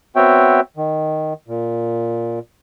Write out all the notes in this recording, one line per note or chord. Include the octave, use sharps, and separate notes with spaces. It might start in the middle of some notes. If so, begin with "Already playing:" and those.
B3 C4 F#4 C#5 E5 G5
D#3
A#2